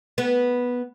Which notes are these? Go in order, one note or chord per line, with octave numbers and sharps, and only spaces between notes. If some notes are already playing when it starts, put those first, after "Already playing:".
B3